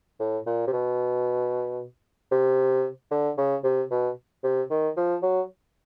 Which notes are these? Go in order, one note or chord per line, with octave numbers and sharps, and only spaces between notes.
A2
A#2
C3
B2
C3
D3
C#3
C3
B2
C3
D#3
F3
F#3